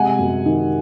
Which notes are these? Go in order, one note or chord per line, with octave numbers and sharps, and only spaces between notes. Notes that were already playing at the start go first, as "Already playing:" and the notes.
Already playing: C3 G#3 F#5 G#5
F#2
D#3